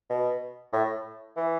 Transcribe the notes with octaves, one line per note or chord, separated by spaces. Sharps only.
B2
A2
E3